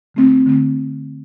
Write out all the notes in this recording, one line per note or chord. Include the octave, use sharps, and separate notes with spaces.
D3 A3 C4
D3 A3 C4